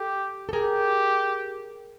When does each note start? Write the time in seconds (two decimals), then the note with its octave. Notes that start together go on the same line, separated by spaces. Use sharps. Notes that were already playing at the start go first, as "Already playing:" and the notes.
Already playing: G4 A4
0.49 A4
0.53 G4 G#4 A#4